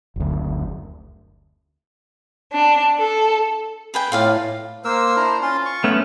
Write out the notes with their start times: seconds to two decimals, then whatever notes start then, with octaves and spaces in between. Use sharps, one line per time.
0.16 F#1 D2
2.52 D4
2.99 A4
3.94 G#4 B4 G5
4.12 A2 F4 D5 F5
4.85 A#3 A#4 C5 E6
5.16 D4 E4 A#5
5.42 C#4 F4 C6
5.65 C#6
5.84 A3 B3 C#4